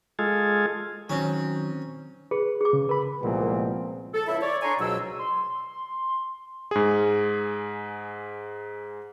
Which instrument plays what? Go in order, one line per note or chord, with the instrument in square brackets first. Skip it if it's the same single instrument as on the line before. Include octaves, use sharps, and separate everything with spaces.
[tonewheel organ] G#3 F4 G#4 A4
[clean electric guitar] D#3 F#3 C4 [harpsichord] C#4
[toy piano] G#4 [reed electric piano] B4
[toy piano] G#4 D6
[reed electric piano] C#3
[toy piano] A#4 [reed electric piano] B4 B5
[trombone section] C2 A#2 F3 G#3 B3 C4
[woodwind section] A4
C#2 E4 E5
C#5 D5
D4 C#5 G#5 A#5 C6 C#6
C#2 G#2 B2 F#3 E6
[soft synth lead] C6
[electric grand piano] G#2 G#4